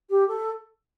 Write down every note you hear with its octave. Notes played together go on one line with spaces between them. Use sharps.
G4
A4